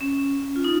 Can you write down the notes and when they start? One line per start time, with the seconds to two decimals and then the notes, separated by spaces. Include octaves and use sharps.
0.01 C#4
0.56 F4
0.64 D#4